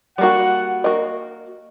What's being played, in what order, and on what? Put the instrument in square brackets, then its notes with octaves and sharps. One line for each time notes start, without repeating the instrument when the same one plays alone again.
[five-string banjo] G3 A#3 F#4 [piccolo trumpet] F#5
[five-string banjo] A#3 F#4 A#4 D#5